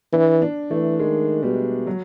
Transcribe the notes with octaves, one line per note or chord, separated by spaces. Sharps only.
E3 D4
D4
E3 A3
D#3 G#3
B2 G3
F#3